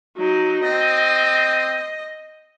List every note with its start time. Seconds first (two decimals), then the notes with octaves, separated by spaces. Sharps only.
0.17 F#3 D#4
0.64 C4 D#5